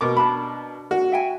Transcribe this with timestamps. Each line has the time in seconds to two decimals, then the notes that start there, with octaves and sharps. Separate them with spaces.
0.01 B2 A#4 D6
0.17 D4 A5 B5
0.91 F#4
1.12 E5 G5 G#5